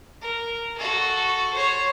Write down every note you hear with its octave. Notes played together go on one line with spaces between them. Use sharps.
A#4
F#4 A4
C5 C#5